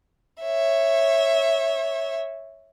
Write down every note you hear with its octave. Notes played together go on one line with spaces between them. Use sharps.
C#5 E5